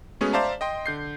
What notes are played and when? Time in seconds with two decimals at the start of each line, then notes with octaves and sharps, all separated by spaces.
0.21 G#3 A3 B3 C#4 F#4 G#4
0.33 C5 D5 E5 F5 A5 A#5
0.61 D#5 G5 C6
0.86 D3 G6 C7